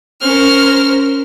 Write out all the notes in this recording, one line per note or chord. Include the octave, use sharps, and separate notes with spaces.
C#4 A#4 C5 F6